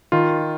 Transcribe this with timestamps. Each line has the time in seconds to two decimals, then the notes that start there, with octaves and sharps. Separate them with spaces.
0.12 D#3 F4